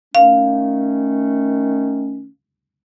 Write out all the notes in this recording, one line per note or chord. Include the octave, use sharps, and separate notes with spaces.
D#3 A3 C#4 F5